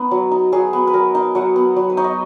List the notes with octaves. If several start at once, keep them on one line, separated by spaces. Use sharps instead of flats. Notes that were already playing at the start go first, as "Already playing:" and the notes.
Already playing: B3 D#4
F#3
D#4
F#3 G#4
B3
B4
F#3 A#4
D#4
F#3 F#5
B3
F#3
B4
D#4 C#5
D#5